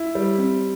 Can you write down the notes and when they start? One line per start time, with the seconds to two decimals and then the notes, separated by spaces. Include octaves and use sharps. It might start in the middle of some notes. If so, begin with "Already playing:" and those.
Already playing: E4
0.15 G3
0.38 C4